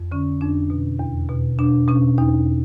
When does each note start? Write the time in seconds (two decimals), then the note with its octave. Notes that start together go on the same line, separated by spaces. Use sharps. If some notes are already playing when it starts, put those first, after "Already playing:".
Already playing: F2
0.12 D3 C#4
0.41 F2 D4
0.70 B2
0.99 E2
1.29 B2
1.59 B2 D4
1.88 B2 C#4
2.18 E2 D#4